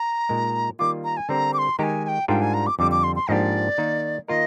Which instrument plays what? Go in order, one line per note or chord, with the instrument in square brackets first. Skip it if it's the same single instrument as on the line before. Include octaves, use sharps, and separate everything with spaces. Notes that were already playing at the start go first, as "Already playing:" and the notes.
Already playing: [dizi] A#5
[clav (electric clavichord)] A#2 G#3 D#4 A#4
[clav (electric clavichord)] D#3 G3 A#3 F4 [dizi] D6
[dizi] A#5
G#5
[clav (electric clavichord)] D3 G3 C4 G4 A#4 [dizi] A#5
[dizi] D6
C6
[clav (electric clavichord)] D#3 G#3 D#4 G4 [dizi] G#5 A#5
[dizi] G#5
G5
[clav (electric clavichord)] G#2 G3 D4 F4 A#4 [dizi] G5
[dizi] G#5
A#5
D6
[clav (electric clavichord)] F2 D3 G3 [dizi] D6
[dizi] D6
C6
C6
[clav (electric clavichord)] G#2 F3 A#3 D4 G4 [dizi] D5 D#5
[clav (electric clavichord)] D#3 A#3 D#4
[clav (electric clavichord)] D#3 A#3 F4 A#4 [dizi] D#5